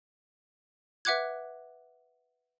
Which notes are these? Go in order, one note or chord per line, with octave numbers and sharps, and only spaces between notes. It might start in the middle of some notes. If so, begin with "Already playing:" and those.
B4 E5 F#5 D6 F#6 G#6